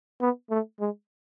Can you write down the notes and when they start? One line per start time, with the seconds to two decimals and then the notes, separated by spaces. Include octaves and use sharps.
0.21 B3
0.50 A3
0.80 G#3